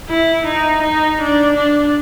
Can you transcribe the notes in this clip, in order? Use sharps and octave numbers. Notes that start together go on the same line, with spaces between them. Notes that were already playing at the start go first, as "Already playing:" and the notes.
E4
D#4
D#4
D4
D4